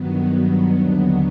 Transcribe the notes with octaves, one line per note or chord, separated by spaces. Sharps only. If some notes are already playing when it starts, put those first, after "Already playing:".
Already playing: G2 D#3 F#3 B3
D#2 D3 F#3 B3